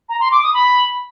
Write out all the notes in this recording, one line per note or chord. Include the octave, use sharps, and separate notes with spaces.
A#5
C6
D6
D#6
B5